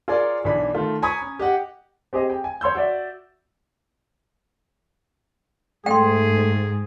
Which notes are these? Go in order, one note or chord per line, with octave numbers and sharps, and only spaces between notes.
F4 G#4 A#4 C#5 D5
B1 E3 D4 B5
D#3 A3 F4
G#5 A#5 B5 C#6 D#6 G#6
C#4
G4 D#5 F#5 G5
C4 G4 G#4 D#5
G5
G#5
C#5 C6 E6 G6
F#4 D5 E5
G#2 A3 G#4 G5 C6